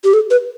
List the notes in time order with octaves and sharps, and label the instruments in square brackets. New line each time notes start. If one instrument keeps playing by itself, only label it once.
[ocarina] G4
A4
B4